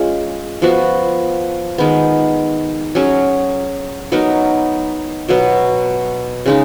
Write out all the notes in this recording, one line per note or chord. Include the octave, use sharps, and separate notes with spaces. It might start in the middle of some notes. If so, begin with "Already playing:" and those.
Already playing: G#3 C#4 F4 G#4
F3 B3 F#4
D#3 G#3 B3
F#3 C#4 G#4
F#3 B3 D#4 A#4
B2 F#3 B3
C#3 G#3 D#4